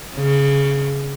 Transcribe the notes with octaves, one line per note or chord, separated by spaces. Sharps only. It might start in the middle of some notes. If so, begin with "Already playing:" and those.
C#3